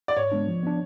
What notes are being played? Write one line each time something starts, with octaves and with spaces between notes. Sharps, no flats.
D5
G#2 C#5
G#3 B3 D4
F3
B3 D4